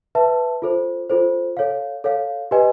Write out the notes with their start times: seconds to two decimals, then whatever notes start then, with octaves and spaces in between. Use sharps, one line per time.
0.15 B4 E5 A5
0.62 F4 A4 C5
1.10 F4 A4 C5
1.57 A4 C#5 F5
2.04 A4 C#5 F5
2.51 G4 B4 D#5 G#5